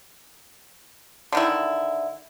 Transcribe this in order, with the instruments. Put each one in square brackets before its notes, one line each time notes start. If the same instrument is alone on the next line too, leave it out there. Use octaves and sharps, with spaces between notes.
[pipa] D3 D#3 E4